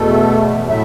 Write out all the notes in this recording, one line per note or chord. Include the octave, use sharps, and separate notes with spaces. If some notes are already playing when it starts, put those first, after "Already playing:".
Already playing: E2 B2 A3 A4
A2 F#3 A3 E5